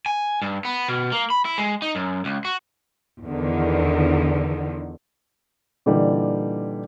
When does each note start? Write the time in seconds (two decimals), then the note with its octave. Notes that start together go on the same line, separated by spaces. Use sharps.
0.06 G#5
0.42 G2
0.65 B3
0.88 B2
1.12 A#3
1.30 B5
1.45 E4
1.58 G#3
1.82 D#4
1.95 F#2
2.25 C#2
2.45 F#4
3.25 E2 D3 D#3
5.86 A#2 D3 E3 G3 D#4